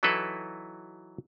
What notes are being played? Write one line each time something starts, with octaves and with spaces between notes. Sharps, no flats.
E3 F#3 D#4 E4 A4 B4